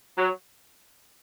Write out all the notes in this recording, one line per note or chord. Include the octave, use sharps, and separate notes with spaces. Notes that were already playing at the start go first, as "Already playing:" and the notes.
F#3